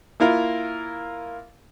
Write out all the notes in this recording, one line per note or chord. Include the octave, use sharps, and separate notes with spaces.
A#3 E4 F4 A#4